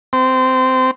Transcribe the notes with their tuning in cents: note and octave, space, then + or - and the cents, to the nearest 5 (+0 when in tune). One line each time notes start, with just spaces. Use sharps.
C4 -20